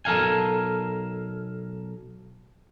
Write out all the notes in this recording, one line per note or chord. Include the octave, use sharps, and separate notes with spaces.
B1 A4 A#4 F5 G#5